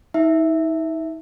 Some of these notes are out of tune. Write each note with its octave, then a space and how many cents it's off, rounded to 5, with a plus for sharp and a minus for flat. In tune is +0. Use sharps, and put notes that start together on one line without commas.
D#4 +45 E5 +0